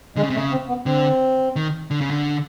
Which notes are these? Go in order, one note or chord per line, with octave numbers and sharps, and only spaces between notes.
D3 G#3
C#3
C3
A3
C#3
C4
B3
D3 C4
D#3
D3
C#3
D3